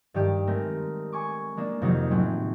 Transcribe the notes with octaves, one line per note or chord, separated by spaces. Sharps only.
G2 D#3 G4
G#3 A3 C4 A#4
G#5 C#6 D6
G#3 A#3 D4
F2 C3 D#3 F3 F#3 D#4
A2 F#3 A3 C4 C#4